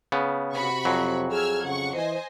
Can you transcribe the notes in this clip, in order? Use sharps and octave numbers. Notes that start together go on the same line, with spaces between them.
C#3 B3
C3 F#4 B5 C#6
F2 F#3
G#4 E6 F6 G#6
C#3 F#5 C#6
E3 C5 D#5 G#5